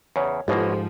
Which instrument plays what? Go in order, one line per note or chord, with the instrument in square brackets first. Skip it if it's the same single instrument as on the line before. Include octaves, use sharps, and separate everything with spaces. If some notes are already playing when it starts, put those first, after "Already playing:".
[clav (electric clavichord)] E2 C#3 [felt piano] C#5
[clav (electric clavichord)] B1 B2 A#3 [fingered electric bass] G#2 [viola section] F3 [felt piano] G4 A4 C5